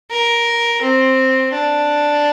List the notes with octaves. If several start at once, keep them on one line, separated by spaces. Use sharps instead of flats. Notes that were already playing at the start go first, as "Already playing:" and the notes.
A#4
C4
D4